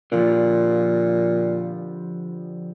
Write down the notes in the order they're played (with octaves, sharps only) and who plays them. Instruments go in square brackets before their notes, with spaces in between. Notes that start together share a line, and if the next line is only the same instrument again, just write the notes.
[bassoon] A#2 [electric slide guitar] D3 F3 G3